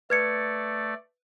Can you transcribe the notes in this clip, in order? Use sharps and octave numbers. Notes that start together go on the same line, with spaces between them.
A3 B4 D5 G#6 C#7